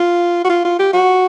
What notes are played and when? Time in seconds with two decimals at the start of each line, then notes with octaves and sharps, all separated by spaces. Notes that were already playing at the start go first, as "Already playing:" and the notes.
Already playing: F4
0.45 F#4
0.49 F4
0.65 F4
0.79 G4
0.93 F#4